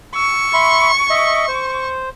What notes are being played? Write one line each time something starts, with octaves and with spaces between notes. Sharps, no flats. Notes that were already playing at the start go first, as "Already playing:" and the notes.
C#6 E6
E5 B5 C6
D#5 E5
C5